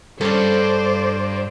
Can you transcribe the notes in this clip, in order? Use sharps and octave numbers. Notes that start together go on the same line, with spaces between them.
G2 C#4 A4 C5 D5